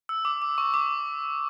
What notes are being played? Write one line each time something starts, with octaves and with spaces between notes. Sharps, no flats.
E6
D6
D6
C#6
D6